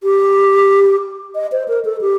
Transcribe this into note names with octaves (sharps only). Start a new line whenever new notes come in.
G4
D#5
C5
A#4
A4
G4